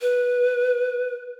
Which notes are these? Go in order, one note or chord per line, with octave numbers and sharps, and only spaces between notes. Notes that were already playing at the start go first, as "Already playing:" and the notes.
B4